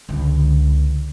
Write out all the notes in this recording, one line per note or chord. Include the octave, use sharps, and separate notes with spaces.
C#2 D3